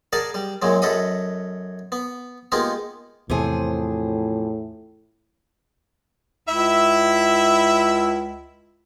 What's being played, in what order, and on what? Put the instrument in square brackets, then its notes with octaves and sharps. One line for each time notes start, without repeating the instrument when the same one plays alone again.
[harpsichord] G#4 A#4 D5 F#5 G#5 A5
G3
F#2 A#2 F#3 G#3
F#2 A4 B4 D#5 F#5 D#6
B3
G#3 A#3 B3 D#4 F4 G4
[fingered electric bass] E2 [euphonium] A2 [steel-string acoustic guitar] C3 F3 G#4
[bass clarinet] C#2 [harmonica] E4 E5